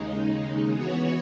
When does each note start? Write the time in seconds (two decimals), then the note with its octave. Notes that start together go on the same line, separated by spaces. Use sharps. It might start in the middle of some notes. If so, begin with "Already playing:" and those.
Already playing: D#2 C#3 G#3 D#4
0.71 E3 B3 F#4 C#5